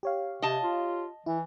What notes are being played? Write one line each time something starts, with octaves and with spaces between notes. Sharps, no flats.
G4 C#5 F5
C3 D#5 A5
F4
E3 E4